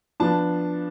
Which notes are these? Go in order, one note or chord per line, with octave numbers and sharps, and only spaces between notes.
F3 B3 D4 A5